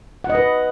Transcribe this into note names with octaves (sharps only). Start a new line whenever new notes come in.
F#5
D#5
B4